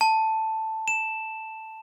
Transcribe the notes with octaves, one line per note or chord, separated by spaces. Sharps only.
A5
E7